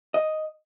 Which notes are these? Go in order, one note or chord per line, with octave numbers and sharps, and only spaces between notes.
D#5